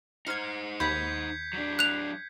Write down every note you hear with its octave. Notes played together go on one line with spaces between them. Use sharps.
D#4 C5 F6 G#6 C7 C#7
D#2 B5 G6 G#6 B6
F#3 D4
F#6 F7